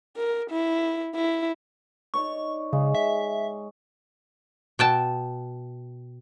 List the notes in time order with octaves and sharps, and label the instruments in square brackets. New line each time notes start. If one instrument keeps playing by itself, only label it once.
[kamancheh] A#4
E4
E4
[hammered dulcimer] D#4 C#5 D5 [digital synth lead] C#6
[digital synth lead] C#3 [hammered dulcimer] G#3
[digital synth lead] E5
[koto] B2 G5 A5